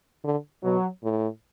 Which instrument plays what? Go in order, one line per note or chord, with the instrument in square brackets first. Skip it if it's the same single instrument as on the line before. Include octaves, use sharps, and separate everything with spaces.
[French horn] D3
[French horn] B2 [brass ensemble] F#3
[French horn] A2